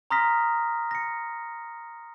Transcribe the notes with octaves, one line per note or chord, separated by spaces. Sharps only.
A#5 C6 D#6 F6 A#6 B6
A#6 C#7